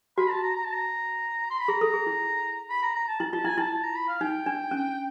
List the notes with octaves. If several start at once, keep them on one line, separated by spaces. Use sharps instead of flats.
F#4 B5
A5
A#5
A#5
A5
A#5
C6
B5
G#4 A#5
A4
G#4
E4
B5
A#5
A#5
A5
E4
F4 A5
E4 G#5
E4 A5
A5
A#5
B5
F5
D#4 G5
D4
C#4